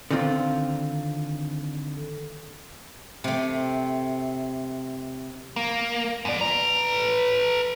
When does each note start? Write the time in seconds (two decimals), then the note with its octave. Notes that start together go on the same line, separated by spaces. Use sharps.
0.11 D3 D#3 C4 F4
3.24 C3 A3
5.56 A#3
6.25 F#2 D5
6.41 B4 A#5